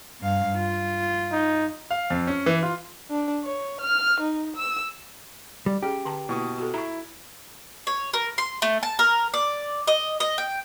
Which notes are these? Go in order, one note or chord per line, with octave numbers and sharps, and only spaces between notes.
G2 F5
F4
D#4
F5
F2
C#4
E3
F4
D4
C#5
F6
D#4
E6
G3
C#4 G4 G#4
D3 A5 A#5
B2 A#3 E4 C#6 D#6
F#4 A4
E4 A#5 C#6
C#5
A#4
C6
A3
A5
A#4
D5
D#5
D#5
G5